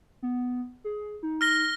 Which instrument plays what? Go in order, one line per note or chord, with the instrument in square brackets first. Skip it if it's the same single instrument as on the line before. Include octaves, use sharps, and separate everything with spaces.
[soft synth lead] B3
G#4
D#4
[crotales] F6 A#6 G7